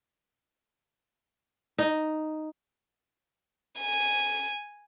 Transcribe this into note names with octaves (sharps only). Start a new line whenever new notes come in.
D#4
G#5